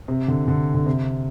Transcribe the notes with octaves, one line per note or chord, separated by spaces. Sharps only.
C3
D3
D3
D3
C3